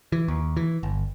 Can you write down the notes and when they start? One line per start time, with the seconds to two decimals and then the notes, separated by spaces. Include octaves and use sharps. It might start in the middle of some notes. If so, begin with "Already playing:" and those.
0.12 E3
0.28 D#2
0.57 E3
0.83 G1